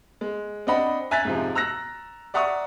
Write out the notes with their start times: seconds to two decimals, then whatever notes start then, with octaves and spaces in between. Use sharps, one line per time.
0.21 G#3
0.67 C4 D4 D#5 F#5 B5
1.11 E5 G#5 A#5 F#6 A6 B6
1.25 G#2 C3 F3
1.55 A#5 E6 F#6 A#6
2.34 D5 E5 F#5 A#5 C#6 D#6